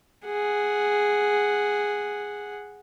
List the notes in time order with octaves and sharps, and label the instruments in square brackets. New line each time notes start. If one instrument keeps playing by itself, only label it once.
[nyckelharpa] G#4 F#5